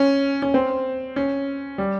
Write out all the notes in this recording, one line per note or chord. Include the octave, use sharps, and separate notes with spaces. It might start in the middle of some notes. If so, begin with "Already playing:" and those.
Already playing: C#4
C#4
C4
C#4
G3